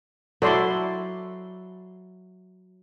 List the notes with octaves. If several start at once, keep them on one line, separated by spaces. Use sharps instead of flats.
F#3 E4 A4 D5 C6